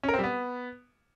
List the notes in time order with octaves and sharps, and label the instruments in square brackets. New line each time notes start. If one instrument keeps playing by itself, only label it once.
[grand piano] C#4
A#4
C4
G3
B3